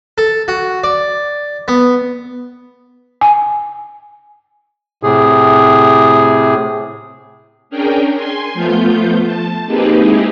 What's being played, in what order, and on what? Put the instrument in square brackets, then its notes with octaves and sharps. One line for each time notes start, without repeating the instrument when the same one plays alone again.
[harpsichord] A4
F#4
D5
B3
[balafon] G#5
[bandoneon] A2 C3 G#4
[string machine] C#4 D4 G#4 A#4 G5
G#5 C6
F3 A3 B3 F4 G6
A5
A#3 C4 D#4 G4 G#4 B4
G#3 D#4 E4 G4 G#4